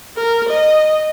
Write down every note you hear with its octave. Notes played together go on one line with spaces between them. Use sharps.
A#4
D#5